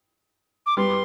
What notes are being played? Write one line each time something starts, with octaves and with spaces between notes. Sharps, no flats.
D6
G3 B3 C6